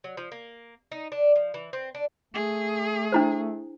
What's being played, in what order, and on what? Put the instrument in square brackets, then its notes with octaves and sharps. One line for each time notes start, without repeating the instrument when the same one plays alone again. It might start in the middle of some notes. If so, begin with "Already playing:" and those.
[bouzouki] F#3
F3
A#3
D#4
D4
F3
E3
C4
D4
[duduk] A3 [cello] G#4
[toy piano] D4 E4 C5